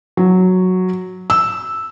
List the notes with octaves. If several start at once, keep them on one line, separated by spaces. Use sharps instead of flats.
F#3
E6